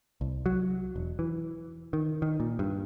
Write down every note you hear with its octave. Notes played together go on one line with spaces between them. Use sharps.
C2
F#3
E1
E3
D#3
D#3
A#2
G2